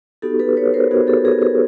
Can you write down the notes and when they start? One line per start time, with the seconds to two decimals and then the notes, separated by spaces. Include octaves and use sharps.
0.22 B3 D#4 F#4 G4 A4
0.39 A4 B4
0.57 B4 C#5
0.74 A#4 C5
0.91 B3 D#4 F#4 G#4
1.07 G4 A4
1.25 G#4 A#4
1.41 G#4 A#4